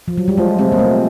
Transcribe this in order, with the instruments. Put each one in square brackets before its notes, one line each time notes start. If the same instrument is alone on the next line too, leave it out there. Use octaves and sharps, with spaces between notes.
[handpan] F3
F#3
G3
[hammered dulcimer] F3 [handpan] G#3
[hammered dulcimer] C3 [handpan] G#3
[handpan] A#3
[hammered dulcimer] G#3 [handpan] A3